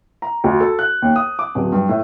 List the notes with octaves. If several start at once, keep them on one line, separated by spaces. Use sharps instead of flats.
A#5
D2
A4
F#6
D#2
D#6
D6
D1
G2
A2